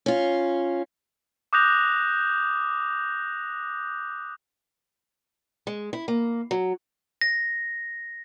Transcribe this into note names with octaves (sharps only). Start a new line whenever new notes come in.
C#4 F4
D6 D#6 F#6 G6 A#6 F7
G#3
E4
A#3
F#3
A#6